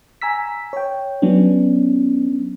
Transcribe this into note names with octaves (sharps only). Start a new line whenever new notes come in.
G#5 A#5 E6 B6
C#5 G5
F#3 B3 C#4 D4